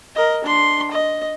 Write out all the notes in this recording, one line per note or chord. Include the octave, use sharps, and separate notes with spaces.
A#4 D#5
D4 C6
D#5